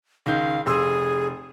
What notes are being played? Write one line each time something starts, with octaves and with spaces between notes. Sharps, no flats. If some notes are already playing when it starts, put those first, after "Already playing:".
C#2 D#3 F5 G6
F1 G#4 C6 E6